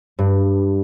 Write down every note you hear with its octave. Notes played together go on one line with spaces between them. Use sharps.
G2